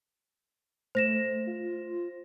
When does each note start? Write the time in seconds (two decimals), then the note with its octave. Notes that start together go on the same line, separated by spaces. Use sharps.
0.95 A3 C5 A#6 E7
1.47 F4